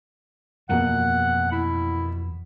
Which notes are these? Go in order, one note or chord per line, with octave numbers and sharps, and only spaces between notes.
F2 B2 E3 F3 A#3 F#5
E4